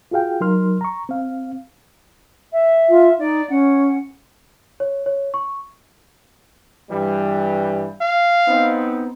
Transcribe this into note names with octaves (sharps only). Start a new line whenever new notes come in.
F4 F#4 G#4 F5 G5
F#3 D#4 A#4 C6 F6
A#5 C#6
C4 F5
E5
F4
D#4 D5
C#4 F#5
C#5
C#5
C#6
G2 E3 G3
F5
B3 C4 D#4